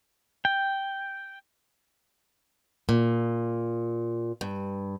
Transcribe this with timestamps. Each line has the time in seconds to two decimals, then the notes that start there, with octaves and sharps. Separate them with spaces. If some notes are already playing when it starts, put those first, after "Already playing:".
0.45 G5
2.89 A#2
4.41 G2